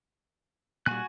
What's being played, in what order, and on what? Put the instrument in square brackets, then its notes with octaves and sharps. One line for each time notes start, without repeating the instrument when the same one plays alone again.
[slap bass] A#2 G3 [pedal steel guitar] F#4 G#5 F#6